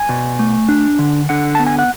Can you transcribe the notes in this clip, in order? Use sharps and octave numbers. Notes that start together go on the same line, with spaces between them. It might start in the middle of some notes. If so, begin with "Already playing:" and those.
Already playing: G#5
B2
A3
D4
D3
D3 F#5
B3 A5
G#5
F#5